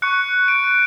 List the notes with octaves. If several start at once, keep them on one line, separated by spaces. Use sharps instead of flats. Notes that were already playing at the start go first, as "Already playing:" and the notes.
C#6 F#6 C#7
D7